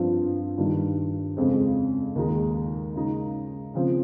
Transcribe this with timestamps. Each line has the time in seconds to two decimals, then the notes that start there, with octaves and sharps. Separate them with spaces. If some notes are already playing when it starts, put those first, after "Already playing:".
Already playing: G2 F3 C4 F4
0.58 G2 D#3 G3
1.37 F2 C#3 G#3 C4
2.15 D#2 D#3 G#3 D#4
2.95 C#3 G#3 D#4
3.74 C#3 F3 C4